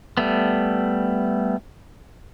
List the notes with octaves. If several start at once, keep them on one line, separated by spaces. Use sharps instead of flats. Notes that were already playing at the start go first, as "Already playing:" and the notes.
G3 A3 B3